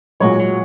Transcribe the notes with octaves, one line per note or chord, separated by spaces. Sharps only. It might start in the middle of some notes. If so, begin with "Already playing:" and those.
A#2 F#3 G#3 F#4 C#5
F#3